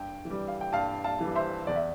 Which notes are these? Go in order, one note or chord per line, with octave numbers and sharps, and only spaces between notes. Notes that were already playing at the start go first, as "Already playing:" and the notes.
Already playing: G2 G5
E3
G3
F5
G5
G2 F5 A5
F5 A5
E3 G3
C5 E5
E2 D5
E5